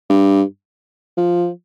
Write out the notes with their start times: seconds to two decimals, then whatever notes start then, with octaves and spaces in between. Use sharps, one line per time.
0.10 G2
1.18 F3